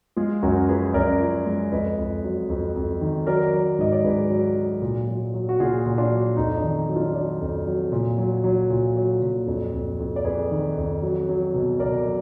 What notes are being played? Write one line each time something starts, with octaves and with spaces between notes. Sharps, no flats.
G#3 F4 G#4
F#2 F#4 A#4
F3 G#4 B4
F#2 A#4 D5
F3
G#3
F2 B4 D#5
F2
F#3
F2
F2
D#3
F#3 A#4 D5
F#3
G#2 D#5
D5
G#2 G#4 B4
F#3
F#3
A#2
F#3
F#3
F#4
A#2 F4 G#4
A#2
D4 F4
F#3
F2 D#4
D4
D#3
D#4
F#3
D4 F4
F#3 D4
F2
F#3
A#2
F#3
F#3
A#2
F#3
A#2
F2 D4
F2
F2
D5
F2 G#4 B4
D#3
F2
F#3
F#3
B2
B2 A#4 D5
F#3